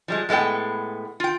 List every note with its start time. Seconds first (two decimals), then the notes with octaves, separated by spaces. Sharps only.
0.08 F3 G3 G#3
0.29 A2 G#3 B3 A4 G5
1.20 F4 G5